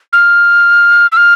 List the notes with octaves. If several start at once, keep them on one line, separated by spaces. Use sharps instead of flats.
F6
E6
F6